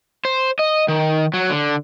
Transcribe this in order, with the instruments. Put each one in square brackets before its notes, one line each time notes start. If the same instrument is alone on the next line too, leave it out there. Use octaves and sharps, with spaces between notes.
[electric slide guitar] C5
D#5
D#3
F#3
D3